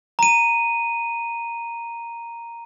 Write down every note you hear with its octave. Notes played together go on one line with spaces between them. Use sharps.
A#5 D#7